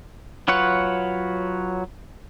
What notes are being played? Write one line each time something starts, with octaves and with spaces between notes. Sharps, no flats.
F#3 F4 B4 C#5 F#5